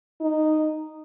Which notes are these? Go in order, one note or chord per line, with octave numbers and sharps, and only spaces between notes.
D#4